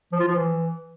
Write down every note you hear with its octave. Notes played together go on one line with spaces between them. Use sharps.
F3
F4
F3
E3